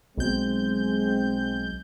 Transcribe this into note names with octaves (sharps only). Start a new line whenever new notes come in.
B1 G#3 C4 G6